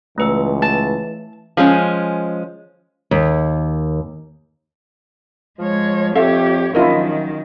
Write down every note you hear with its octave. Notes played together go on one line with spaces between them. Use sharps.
C#2 E3 A3 B4 E6
A5
F3 G#3 C#4
D#2
F3 G#3 C#5
F2 G4 A4 C#5 E5 F5
A#1 D#3 F#3 C#4 E4 F4 A#4 D#5